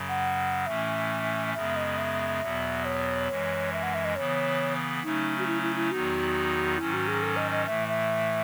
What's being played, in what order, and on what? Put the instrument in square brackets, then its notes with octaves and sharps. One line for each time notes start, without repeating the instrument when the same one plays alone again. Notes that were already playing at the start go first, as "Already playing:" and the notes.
Already playing: [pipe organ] F#2 C#3 F#3
[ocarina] F#5
[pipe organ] A2 E3 A3 C#4 [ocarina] E5
[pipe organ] F#2 C#3 G#3 B3 [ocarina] E5
[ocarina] D#5
E5
[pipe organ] E2 B2 F#3 B3
[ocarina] C#5
[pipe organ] F#2 E3 G#3
[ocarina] E5
F#5
E5
D#5
[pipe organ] C#3 E3 B3 [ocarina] C#5
[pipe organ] C#3 F#3 A3 C#4 [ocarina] D#4
[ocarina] F#4
E4
E4
E4
[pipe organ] E2 D#3 F#3 B3 D#4 [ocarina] F#4
[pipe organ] G#2 D#3 F#3 C#4 [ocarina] E4
[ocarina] F#4
G#4
A4
D#5
D#5
[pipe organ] A2 E3 A3 [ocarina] E5
[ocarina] E5